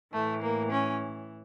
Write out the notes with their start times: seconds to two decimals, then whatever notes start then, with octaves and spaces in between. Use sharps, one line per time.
0.13 A2 E3 A3
0.42 A#3
0.71 C#4